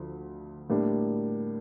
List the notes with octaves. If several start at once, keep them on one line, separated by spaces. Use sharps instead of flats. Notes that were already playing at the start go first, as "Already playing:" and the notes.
Already playing: D2 F3
A2 G3 A#3 D4